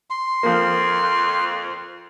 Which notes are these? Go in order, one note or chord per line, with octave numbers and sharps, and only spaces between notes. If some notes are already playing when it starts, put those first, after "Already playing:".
C6
F2 F3 A#3